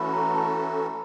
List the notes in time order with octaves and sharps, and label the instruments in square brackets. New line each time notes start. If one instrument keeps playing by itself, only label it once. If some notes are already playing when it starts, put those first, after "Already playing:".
Already playing: [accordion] E3 A3 C#4 F#4 A4 [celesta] B5
[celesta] A#5
A5